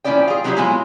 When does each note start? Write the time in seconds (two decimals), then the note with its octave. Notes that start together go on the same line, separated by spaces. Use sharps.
0.04 A#2 F3 C#4 E4 D5 G5
0.28 F4 G#4
0.44 F#3 A#3 C#4 E4 G4 G#4
0.56 A#2 F#3 G#3 B3 E4 F4